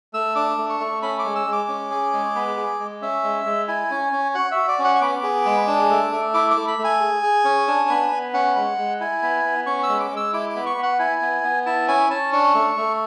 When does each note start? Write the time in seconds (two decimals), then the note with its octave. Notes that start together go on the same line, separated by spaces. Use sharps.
0.13 A3 E6
0.35 D4 D6
0.58 A3
0.69 C#6
0.80 A3
1.02 C#4 B5
1.19 D6
1.25 G#3
1.36 E6
1.47 G#3
1.52 D6
1.69 C#4
1.91 G#4
2.13 G#3
2.35 B3
2.57 G#4
2.80 G#3
3.02 C#4 E5
3.24 G#3
3.45 G#3
3.68 E4 G#5
3.90 C#4
4.13 C#4
4.35 F#4 F#5
4.51 F#4 E5
4.68 D5
4.79 C#4
4.84 F#5
4.96 C#6
5.01 B3 D6
5.23 G#4
5.46 G#3
5.68 D4
5.90 A3
6.12 A3
6.34 E4 D6
6.51 D6
6.56 A3
6.68 B5
6.79 A3
6.84 G#5
7.00 G#4
7.23 G#4
7.45 C#4
7.68 D4
7.89 B3
8.11 B3
8.34 C#4 F#5
8.56 G#3
8.78 G#3
9.00 E4 G#5
9.22 B3
9.45 B3
9.66 C#4 C#6
9.83 E6
9.89 G#3
10.00 D6
10.11 G#3
10.16 E6
10.33 E4 D6
10.49 D6
10.55 B3
10.66 C#6
10.78 B3
10.83 F#5
10.99 E4 G#5
11.22 B3
11.44 B3
11.66 E4 A5
11.88 C#4 G#5
12.10 C#4 A5
12.32 D4 C#6
12.54 A3
12.77 A3